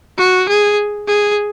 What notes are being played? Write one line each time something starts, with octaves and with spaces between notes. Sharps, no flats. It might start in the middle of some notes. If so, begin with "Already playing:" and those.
F#4
G#4
G#4